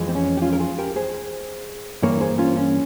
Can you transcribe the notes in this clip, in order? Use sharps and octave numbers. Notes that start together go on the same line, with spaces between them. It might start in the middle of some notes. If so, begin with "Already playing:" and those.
Already playing: F2 E3 G#3
C4
C#4
G4
C#4 F4
A#4
F4 G#4
G4 A#4
G#4 C5
G2 E3 A#3 A#4 C#5
G#4 C5
C#4 F4
C#4